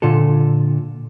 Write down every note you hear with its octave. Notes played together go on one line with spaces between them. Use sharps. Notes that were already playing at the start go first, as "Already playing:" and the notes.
A#2 D3 F4 A4